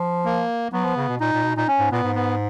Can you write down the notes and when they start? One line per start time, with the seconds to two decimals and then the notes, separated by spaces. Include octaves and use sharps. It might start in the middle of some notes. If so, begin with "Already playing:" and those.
Already playing: F3
0.25 A#3
0.72 F#3 B3
0.84 F3
0.96 C#3
1.09 B2
1.20 A#2 D#4
1.33 A#2
1.43 B2
1.56 A#2 D#4
1.68 C#4
1.79 G#2
1.92 A#2 B3
2.04 G#2
2.16 B3